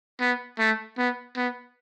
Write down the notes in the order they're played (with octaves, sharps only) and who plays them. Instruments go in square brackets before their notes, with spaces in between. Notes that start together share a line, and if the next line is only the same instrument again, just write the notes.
[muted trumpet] B3
A3
B3
B3